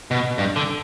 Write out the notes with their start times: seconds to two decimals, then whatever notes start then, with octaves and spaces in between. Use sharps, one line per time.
0.11 B2
0.38 G2
0.56 D3